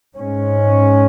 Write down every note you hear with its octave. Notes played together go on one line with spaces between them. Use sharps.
G#2 G#3 C#4